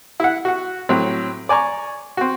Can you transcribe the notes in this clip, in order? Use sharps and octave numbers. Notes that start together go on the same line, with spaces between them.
E4 F#5
F#4 F#5
A2 F#3 C4
D5 G#5 A#5 C#6
C4 F#4